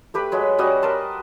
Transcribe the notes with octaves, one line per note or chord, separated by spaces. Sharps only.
A3 G4 B4 B5
F#3 G#3 B4
G3 C#4 F#4 D#5
A#4 B4 A5 C6